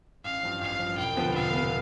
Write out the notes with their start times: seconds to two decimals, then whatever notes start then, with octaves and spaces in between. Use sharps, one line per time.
0.25 A1 F5
0.43 G2 F3
0.61 A1 F5
0.79 G2 F3
0.97 E1 G5
1.16 D2 C3 F3 B3
1.34 E1 F5
1.53 C3 F3 B3